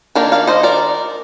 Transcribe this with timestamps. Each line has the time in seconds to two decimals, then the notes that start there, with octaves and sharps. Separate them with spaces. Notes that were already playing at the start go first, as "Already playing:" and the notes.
0.15 D#3 A#3 D4 A#4 D5
0.32 D5 F5
0.47 C5 D#5
0.63 A#4 D5